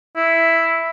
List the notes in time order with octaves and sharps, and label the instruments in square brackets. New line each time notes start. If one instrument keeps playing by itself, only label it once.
[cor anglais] E4